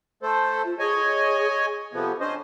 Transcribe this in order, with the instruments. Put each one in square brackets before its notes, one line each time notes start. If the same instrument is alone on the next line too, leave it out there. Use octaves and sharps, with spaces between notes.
[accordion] A3 A4 C5
[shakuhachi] F4
[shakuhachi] G#4 [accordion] C#5 D#5 G#5
[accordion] C3 F3 B3 [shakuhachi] A4
[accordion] C#4 C5 D#5 [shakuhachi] D4